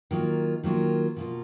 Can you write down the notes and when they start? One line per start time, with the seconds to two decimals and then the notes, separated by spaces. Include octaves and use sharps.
0.11 D#3 F#3 A#3 F4
0.63 D#3 F#3 A#3 F4
1.16 B2 A#3 F4